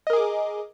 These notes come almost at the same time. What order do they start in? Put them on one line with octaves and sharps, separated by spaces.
D#5 A#4 G#4 D6